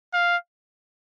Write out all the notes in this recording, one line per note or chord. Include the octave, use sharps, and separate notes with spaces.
F5